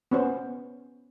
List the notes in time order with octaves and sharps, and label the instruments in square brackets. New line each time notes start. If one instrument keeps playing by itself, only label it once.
[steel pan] B3 C#4 C5